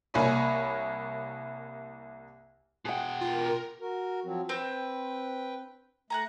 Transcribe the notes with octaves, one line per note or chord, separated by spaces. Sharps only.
C2 A#3 C#5 G#5 B5
B2 G#4 F#5 G5
F4 A#4
F#4 A#4
F3 F#3 C4
C4 B4 G5
A3 F#5 G#5 A#5